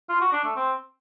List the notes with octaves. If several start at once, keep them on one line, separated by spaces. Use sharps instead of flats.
F4
F#4
D4
A3
C4